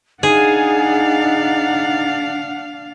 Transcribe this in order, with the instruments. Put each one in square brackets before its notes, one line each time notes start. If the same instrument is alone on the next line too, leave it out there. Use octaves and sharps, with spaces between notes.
[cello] D4 F5 [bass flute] D#4 [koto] G#4 [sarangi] F#5